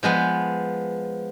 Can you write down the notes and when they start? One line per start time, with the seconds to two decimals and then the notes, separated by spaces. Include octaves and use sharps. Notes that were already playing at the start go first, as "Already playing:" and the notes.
0.03 F3 G#3 B3 B4